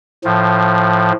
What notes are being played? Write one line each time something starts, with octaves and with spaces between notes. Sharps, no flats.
A2 F3